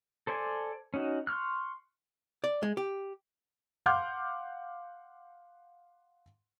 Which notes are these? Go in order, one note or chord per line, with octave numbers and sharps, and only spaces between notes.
A4 C5 D5 G#5
C#4 D#4 F#4
C6 C#6 F6 F#6
D5
G#3
G4
F5 F#5 C6 D6 F6 G6